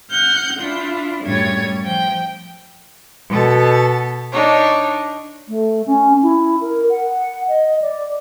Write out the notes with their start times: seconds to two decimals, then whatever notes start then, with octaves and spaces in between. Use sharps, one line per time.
0.10 F#5 F6 G6
0.61 D4 E4 F4
1.24 F#2 A2 G3 C#5 G#6 A6
1.82 F3 G5
3.31 B2 A4
4.32 D4 D#4 C#5
5.49 A3
5.86 C#4
6.22 E4
6.61 A#4
6.90 F#5
7.48 D#5
7.81 D5